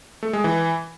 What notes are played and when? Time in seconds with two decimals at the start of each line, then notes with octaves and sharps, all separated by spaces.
0.23 A3
0.33 G#3
0.44 E3